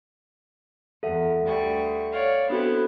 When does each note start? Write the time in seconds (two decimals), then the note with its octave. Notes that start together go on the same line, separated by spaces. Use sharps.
1.03 E2 A4 E5 F#5
1.44 D2 G3 C#6
2.11 C#5 D5 F5
2.50 B3 C4 D4 E4 F#4 A4